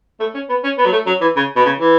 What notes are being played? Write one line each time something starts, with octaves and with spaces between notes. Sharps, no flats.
A3
C#4
B3
C#4
B3
F#3
A3
F#3
E3
C#3
B2
C#3
E3